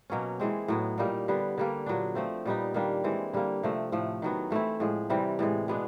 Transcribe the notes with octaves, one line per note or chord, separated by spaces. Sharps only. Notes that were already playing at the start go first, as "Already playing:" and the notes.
B2 F#3 A#3 C#4
E3 G#3 C4
A2 F#3 B3
A#2 G3 A#3 D#4
D3 G3 B3
D3 G3 A#3
A#2 F#3 B3 D4
F3 A3 C4
A#2 G3 B3 D#4
D#3 G3 A#3 D4
E3 G#3 C4
D3 G3 A#3
C3 F3 A3
A2 F3 A3
D#3 F#3 B3
E3 A3 C4 E4
A2 F3 G#3
C3 E3 G3 C4
A2 E3 G#3
B2 G#3 B3 D4